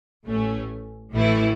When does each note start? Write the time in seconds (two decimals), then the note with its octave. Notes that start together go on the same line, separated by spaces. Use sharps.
0.27 A1 A2 A3 C#4
1.13 A1 A2 E3 A3 E4